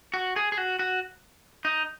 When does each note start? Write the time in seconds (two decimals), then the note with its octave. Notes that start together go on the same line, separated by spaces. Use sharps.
0.14 F#4
0.36 G#4
0.52 G#4
0.58 F#4
0.79 F#4
1.65 D#4